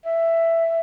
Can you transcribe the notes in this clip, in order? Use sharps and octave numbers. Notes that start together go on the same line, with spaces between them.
E5